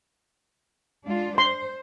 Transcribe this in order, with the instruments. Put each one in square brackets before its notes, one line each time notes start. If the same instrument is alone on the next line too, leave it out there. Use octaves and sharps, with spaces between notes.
[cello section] G#3 D4 F4
[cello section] C5 [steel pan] C6